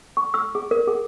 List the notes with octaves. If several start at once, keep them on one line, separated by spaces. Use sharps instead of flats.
C#6
E6
G#4
A#4
G#4